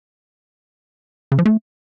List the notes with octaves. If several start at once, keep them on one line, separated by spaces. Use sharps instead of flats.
C#3
F3
A3